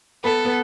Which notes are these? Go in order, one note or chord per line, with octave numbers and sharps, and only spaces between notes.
B3 A4 B4
B3 B4